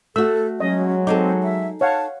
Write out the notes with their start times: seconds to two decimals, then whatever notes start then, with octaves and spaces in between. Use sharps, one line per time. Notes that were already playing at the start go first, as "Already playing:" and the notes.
0.16 A3 F#4 A4 E6
0.60 F#3 G#3 C#4 D#5
1.07 C4 D#4 G#4 A4 D6
1.43 E5
1.81 C#5 F5 F#5 A5